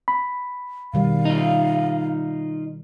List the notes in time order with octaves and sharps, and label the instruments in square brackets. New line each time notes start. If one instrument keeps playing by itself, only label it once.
[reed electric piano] B5
[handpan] B2 D#3 G3 [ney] F5
[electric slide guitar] D#4 F4